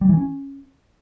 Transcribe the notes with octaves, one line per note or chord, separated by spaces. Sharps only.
G3
E3
C#4